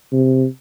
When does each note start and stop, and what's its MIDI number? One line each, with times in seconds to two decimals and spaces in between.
0.13 0.46 48